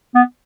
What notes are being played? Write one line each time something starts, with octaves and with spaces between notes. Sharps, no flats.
B3